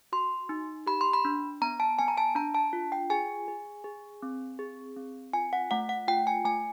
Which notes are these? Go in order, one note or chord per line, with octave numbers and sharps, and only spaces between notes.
F#4 C6
D#4
G4 B5
C6
B5
D4
B3 A#5
A5
B3 G#5
A#5
A5
D4 A#5
A5
F4
G5
G#4 G#5
G#4
G#4
C4
G#4
C4
F4 G#5
F#5
A3 F#5
F#5
F4 G5
G#5
A3 G#5